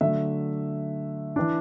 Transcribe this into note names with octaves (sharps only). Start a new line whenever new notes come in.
D3 F#3 A3 E5
E3 D4